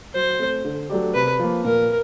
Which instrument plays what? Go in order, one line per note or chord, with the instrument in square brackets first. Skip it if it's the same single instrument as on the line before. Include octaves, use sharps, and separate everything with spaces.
[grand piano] F#3 [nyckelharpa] C5
[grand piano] A3 C4
D3
F#3 A3 D4 G4
[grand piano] C3 [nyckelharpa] B4
[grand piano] F3 A#3
[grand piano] A#2 [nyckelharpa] A#4